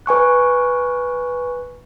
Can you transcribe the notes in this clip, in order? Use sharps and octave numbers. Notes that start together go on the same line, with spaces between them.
B4 G#5 C#6 F#6